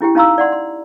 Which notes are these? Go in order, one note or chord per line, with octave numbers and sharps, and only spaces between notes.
C#4 E4 G4 G5
C#4 D#4 F5 A#5 C6 E6
D5 F#5 C6
C6